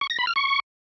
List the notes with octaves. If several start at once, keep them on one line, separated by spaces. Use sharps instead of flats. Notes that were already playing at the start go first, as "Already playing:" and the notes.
C#6
A#6
B5
F6
C#6